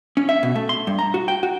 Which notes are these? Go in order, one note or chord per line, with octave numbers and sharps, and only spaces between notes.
C#4
E5
B2
A3
C6
G2
A#5
F#4
G5
F#4